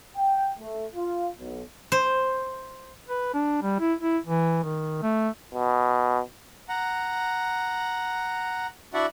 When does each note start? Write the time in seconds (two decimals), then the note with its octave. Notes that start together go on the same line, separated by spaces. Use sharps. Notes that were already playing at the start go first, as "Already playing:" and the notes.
0.17 G5
0.60 A3
0.95 F4
1.39 B1
1.92 C5
3.09 B4
3.34 D4
3.62 G3
3.80 E4
4.01 E4
4.26 E3
4.64 D#3
5.02 A3
5.54 B2
6.69 F#5 A#5
8.94 D4 E4 F#4 D5 E5 F#5